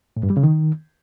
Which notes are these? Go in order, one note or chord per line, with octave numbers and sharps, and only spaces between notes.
A2
G2
G3
C#3
D#3